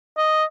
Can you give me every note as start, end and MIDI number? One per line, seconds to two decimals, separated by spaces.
0.17 0.44 75